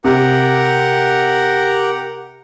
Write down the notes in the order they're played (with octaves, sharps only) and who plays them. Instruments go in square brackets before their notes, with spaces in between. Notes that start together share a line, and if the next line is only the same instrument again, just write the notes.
[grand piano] C3 [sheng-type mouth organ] G4 A#4 F#5